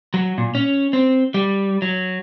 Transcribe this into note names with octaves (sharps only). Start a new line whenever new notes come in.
F#3
A#2
C#4
C4
G3
F#3